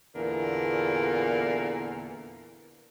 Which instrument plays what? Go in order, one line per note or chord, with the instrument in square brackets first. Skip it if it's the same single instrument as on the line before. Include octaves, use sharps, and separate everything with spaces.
[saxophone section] E2 A#2 D3 A#4